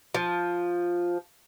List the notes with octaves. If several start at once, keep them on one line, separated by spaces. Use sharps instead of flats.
F3